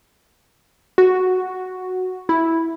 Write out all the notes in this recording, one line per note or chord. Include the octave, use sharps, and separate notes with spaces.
F#4
E4